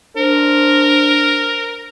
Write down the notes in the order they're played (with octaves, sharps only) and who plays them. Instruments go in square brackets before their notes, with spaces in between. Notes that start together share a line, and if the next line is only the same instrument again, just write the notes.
[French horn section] D4 C5 [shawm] A#4